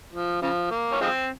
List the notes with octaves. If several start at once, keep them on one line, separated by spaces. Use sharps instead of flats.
F3
C#3 F3
A#3
C#4
F3 G#3 C4